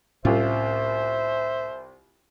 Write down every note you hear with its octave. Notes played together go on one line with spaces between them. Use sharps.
C2 A2 C#4 F4 C5 E5